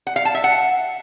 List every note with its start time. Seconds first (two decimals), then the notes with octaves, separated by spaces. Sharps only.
0.07 F#5
0.16 F5
0.25 A5
0.35 E5
0.44 F#5